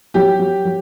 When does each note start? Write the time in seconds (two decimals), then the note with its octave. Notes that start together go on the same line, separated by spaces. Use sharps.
0.14 F#3 G4
0.39 F#3
0.65 F#3